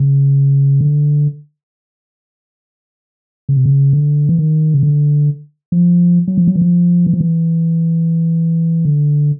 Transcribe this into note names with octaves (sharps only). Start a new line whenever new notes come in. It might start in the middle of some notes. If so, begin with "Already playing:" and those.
Already playing: C#3
D3
C#3
C3
C#3
D3
E3
D#3
C#3
D3
F3
F#3
F3
F#3
E3
F3
E3
F3
E3
D3